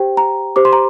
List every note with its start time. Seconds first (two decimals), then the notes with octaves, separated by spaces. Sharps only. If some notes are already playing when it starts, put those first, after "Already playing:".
Already playing: G4 C5 G5
0.17 A#5
0.56 G4 C5 D6
0.65 C6
0.73 A#5